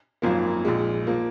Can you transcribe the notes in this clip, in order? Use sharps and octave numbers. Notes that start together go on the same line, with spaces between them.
G#1 F#2 F3 A#3
A#1 A#2 G#3
F3 A#3